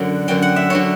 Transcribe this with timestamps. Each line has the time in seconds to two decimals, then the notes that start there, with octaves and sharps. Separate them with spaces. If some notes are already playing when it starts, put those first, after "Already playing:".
Already playing: F#2 D3 F#3
0.28 F#2 D3 F#3 G5
0.42 F#5
0.56 E5
0.70 F#2 D3 F#3 C#5